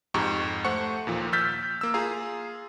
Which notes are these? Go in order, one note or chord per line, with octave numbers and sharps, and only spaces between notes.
F2 G#2 G4 A#5 C#6
A3 C5 F#5 C#6 C#7
D#2 A#2 F3
E6 F6 G6 A6 B6
A#3 E6
F4 G#4 F5 A#5